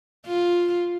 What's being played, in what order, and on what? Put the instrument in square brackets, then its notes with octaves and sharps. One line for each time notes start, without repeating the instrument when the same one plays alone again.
[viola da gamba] F4